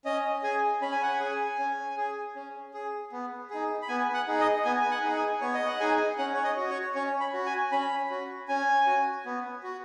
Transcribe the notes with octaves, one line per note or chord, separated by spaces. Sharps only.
C#4 D#5
G#4 G#5
C#4 B5
G#5
F#5
G#5
G#4
C#4
G#4
C#4
G#4
B3
D#4 G#4
B5
B3 G#5
F#5
D#4 G#4
D#5
B3 G#5
G#5
F#5
D#4 G#4
G#5
B3 C#5
D#5
F#5
D#4 G#4 G#5
C#4 F#5
C#5
D#5
F#4
C#5
C#4 C#5
B5
F#4
G#5
C#4 B5
F#4
C#4 G#5
F#4
B3
F#4